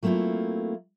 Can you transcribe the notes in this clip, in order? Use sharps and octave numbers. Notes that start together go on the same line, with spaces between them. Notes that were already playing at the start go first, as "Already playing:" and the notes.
F#3 A3 A#3 C4 E4 F4